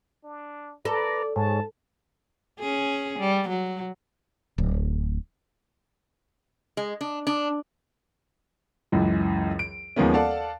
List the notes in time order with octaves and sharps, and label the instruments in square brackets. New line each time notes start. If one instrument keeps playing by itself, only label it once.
[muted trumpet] D4
[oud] A4 [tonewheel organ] B4 A#5 [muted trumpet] D5
[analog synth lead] G#2 [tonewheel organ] G#4 C#5 [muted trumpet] A5
[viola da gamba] C#4 G#4
G3
F#3
[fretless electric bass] D1
[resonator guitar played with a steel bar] G#3
D4
D4
[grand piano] C#2 F#2 E3
D7
D#2 F3 G#3 A#3 B3 C#4
A4 D5 F5 F#5 A5